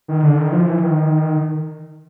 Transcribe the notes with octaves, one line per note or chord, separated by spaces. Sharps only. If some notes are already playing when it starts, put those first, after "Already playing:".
D#3
D3
D#3
F3
E3
D#3